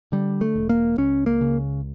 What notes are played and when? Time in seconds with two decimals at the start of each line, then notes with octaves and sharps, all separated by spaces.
0.12 D3 G3
0.41 A3
0.56 E1
0.69 A#3
0.98 C#2 C#4
1.26 A#3
1.41 C#3